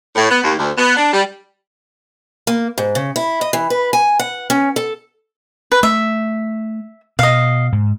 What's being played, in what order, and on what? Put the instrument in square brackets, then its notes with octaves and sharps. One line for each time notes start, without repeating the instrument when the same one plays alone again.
[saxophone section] A2
B3
D#2
D2
B3
D4
G3
[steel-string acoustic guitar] A#3
G#2
C#3
E4
D#5
E3
B4
G#5
F#5
C#4
A4
[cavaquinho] B4
[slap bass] A3 [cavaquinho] E5
[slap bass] B2 [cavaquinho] D#5 F5
[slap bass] G#2